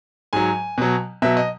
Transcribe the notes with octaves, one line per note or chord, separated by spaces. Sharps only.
G#2 F#3 G#5
B2 F#3
B2 F#3 E5
D#5